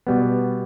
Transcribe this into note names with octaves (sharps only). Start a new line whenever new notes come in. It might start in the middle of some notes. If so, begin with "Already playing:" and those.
B2 G3 B3